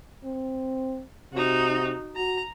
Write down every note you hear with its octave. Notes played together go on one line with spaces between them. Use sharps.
C4
C3 D#4 F#4
F#4 A#5